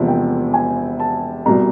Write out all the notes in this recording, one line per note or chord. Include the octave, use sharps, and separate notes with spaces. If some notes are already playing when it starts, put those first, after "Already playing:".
Already playing: E1 E2 C3 F3 A#3
G5
G#5
A5
C2 B2 G3 A#5